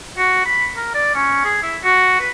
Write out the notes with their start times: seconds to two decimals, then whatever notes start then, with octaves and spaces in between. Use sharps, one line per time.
0.17 F#4
0.45 B5
0.76 A#4
0.94 D5
1.15 C#4
1.44 G#4
1.63 E4
1.84 F#4
2.20 B4